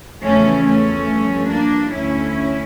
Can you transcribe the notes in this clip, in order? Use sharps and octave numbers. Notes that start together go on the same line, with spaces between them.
E2 C#3 F3 A3 C#4
A3 C#4
G2 F3
A#3 D4
D2 D3 C#4 E4